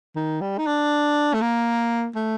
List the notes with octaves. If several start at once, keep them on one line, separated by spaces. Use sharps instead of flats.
D#3
G3
D#4
D4
A3
A#3
A3